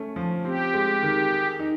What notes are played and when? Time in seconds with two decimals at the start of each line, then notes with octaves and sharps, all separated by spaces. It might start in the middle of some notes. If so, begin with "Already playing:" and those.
Already playing: A3 C#4
0.16 F3
0.44 C4 G4
0.74 G#3
1.03 D#3
1.30 G#4
1.59 D#4